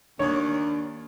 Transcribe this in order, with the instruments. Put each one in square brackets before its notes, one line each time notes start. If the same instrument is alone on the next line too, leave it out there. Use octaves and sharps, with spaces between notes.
[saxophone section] D#2 [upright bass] D#3 A#3 [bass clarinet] D4 [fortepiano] C#5